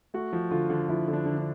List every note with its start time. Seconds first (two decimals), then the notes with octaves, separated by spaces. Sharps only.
0.14 A3 F#4
0.33 F3
0.51 D3 F4
0.70 D3
0.89 F3 E4
1.08 D3
1.13 D4
1.26 D3
1.38 D4